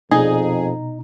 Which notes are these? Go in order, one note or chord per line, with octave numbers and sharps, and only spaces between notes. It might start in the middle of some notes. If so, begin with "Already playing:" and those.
F2 B2 D#4 G#4 A#5